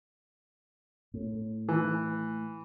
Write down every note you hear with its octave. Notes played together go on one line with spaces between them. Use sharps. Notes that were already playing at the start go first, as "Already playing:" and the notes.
A2
E3